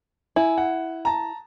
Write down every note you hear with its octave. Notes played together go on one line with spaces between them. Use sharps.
E4 G#5
F#5
A5 A#5